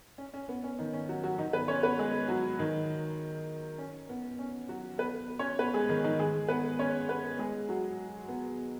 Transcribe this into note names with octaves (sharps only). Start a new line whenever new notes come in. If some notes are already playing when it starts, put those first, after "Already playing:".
C#4
C#4
B3
C#4
D#3 D#4
C#4
F#3 F#4
F#3 F#4
D#3 D#4
B3 B4
C#4 C#5
B3 B4
G#3 G#4
F#3 F#4
D#3 D#4
C#4
B3
C#4
F#3 F#4
B3 B4
C#4 C#5
B3 B4
G#3 G#4
D#3 D#4
D#3 D#4
G#3 G#4
B3 B4
C#4 C#5
B3 B4
G#3 G#4
F#3 F#4
B3